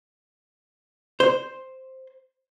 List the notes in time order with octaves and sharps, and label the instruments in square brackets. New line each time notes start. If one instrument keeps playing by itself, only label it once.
[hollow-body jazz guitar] C5